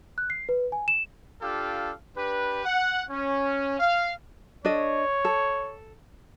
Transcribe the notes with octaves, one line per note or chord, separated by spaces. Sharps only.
F#6
C7
B4
G#5
E7
D4 F4 G4 A4 F5
D4 G4 B4
F#5
C#4
F5
D4 A4 C#5 D#5
A4